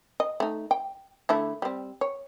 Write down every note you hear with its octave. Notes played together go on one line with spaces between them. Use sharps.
D#5
A3 D#4
G5
D3 A3 E4
G3 C4
C#5